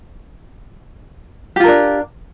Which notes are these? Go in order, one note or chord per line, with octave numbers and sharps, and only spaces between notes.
D4 F4 G4 A#4